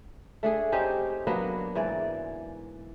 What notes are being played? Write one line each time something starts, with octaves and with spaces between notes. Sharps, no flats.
A3 D4 G#4
C4 C#4 D#4 G4
F#3 A#3 B3 D4
G#2 E3 D5